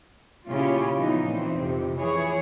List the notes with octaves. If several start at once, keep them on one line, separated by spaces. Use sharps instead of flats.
A#2 C#3 C#4 E4 F4 G4
E3 F3 B3 D#4
A#2 E3 C4
F2 C3
E3 E4 G#4 C#5